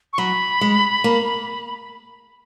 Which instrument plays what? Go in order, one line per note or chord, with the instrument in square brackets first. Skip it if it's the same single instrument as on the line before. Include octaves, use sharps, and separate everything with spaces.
[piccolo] C#6
[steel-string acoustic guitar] F#3 [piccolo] B5
[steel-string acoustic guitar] G#3
A#3